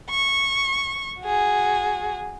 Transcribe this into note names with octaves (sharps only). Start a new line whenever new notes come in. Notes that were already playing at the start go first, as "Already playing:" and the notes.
C#6
F#4 G#4